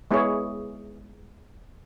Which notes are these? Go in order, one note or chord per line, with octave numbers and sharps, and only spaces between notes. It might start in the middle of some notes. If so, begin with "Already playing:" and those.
G#3 B3 E4 G#4 C#5